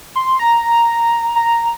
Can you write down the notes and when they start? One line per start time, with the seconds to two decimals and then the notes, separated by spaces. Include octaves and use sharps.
0.16 C6
0.39 A#5
1.36 A#5